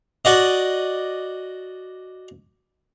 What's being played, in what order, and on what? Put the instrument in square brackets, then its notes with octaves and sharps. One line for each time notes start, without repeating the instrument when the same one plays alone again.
[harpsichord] F#4 D5 D#5